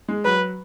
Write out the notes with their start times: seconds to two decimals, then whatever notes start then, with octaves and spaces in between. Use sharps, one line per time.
0.09 G#3
0.25 F#3 B4